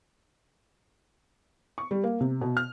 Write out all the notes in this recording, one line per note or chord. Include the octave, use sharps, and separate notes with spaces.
C#6
G3
A#3
C3
B2
F6